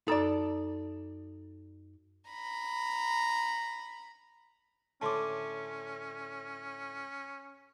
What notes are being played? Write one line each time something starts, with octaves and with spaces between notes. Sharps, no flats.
F#2 D#4 A4 D5
A#5 B5
A2 D3 A3 C#4 A5 C6 D6